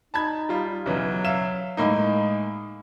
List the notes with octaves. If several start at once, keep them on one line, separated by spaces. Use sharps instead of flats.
D#4 A5 B5 G#6
G3 F4
B1 C#3 E3 F#3
E5 F5 E7
A2 G#3 A#3 D#4